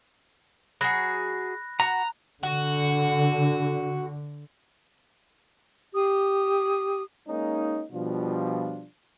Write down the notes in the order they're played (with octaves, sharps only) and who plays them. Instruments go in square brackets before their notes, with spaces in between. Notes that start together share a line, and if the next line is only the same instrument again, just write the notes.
[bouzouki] F#3 F#4 G#4 [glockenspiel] B5 F#6 A#6
[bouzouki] F#4 [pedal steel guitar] A#5
[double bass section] D3 [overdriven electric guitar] F#4
[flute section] G4 D#6
[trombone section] G#3 A#3 C#4 D#4
B2 F3 G3 D4 F4